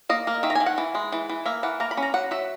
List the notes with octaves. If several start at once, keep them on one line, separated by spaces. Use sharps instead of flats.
A#3 D#5
A#3
D#3 E5
A#5
D#3 G#5
F#5
E3
G#3
E3
E3
A#3 E5
E3 F#5
A#3 A#5
B5
C#4
A#5
F#3 F#5
F#3 E5